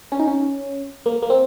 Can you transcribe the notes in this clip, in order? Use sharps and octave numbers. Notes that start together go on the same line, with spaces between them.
C#4
D#4
C#4
A#3
A#3
C4